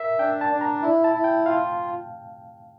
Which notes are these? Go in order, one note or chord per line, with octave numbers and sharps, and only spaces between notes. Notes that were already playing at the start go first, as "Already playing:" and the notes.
Already playing: A#4 E5
D4 G5
A5
D4
A#5
E4
A5
E4
G5
F4 F5